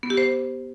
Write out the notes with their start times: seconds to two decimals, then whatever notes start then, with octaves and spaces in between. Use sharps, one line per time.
0.03 B3
0.10 G4
0.17 C5